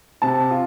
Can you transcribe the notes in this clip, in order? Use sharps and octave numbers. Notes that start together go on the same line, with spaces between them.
C3 A5
F4